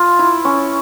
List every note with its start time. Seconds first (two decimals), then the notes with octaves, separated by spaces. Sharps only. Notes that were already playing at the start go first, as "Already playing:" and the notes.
Already playing: F4
0.19 E4
0.45 C#4